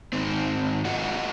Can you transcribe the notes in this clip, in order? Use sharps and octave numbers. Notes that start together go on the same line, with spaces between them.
G#2 D#3 C4
F4 F#4 G#4 D#5 F#5